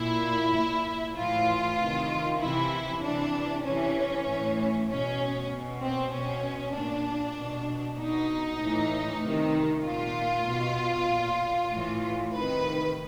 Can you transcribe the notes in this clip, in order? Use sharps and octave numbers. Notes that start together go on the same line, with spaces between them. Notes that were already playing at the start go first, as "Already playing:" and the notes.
Already playing: A#2 E4
A#2
A2 E3 F4
C3 D#3
C3 E3 E4
C3 E3 D4
C3 E3 C#4
A2 E3
B2 C#4
B2
C4
B2 C#4
A#2 D4
B2
B2 D#4
A2 E3
C3 D#3
A#2 F4
B2
A#2
A2 E3
C3 D#3 B4